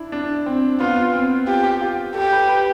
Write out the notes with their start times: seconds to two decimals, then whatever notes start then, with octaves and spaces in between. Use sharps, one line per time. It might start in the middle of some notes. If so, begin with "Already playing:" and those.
Already playing: D4 E4
0.12 D4
0.46 C4
0.80 B3 F4
1.13 C4
1.47 F4 G4
1.81 F4
2.15 G4 A4
2.32 B4
2.48 B4